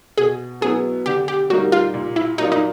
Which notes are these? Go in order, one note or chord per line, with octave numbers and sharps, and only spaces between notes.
B2 G#4
F#3 B3 E4 G#4
D3 G4
G4
G3 A#3 D#4 F#4
F4
A#2
E4
F#3 A#3 D4 D#4 F4
D#4